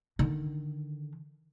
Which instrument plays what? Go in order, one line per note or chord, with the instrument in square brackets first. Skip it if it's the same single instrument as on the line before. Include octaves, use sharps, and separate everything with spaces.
[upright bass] D3 D#3